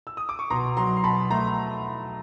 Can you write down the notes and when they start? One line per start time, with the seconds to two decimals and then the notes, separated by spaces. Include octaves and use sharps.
0.07 E6
0.17 D#6
0.29 D6
0.39 C#6
0.50 B2 A#5 C6
0.77 F#3 A#5 C6
0.97 C6
1.04 B2 A5 B5
1.30 A3 A#5 C6